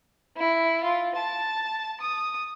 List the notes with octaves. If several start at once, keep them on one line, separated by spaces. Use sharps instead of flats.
E4
F4
A5
D#6